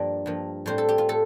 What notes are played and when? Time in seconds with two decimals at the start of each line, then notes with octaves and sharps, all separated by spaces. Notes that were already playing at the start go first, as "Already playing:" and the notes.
Already playing: G2 F3 A#3 D5
0.26 G2 F3 A#3
0.66 A2 G3 C4 C5
0.78 A4
0.89 G4
0.98 F4
1.09 A2 A4